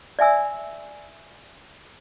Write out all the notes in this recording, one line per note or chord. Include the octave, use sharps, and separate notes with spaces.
D5 E5 G#5 E6